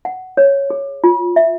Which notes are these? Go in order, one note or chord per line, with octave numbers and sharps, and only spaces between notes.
F#5
C#5
G#4
F4
E5